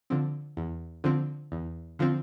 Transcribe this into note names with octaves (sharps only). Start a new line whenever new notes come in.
D3 F3 C4
E2
D3 F3 C4
E2
D3 F3 C4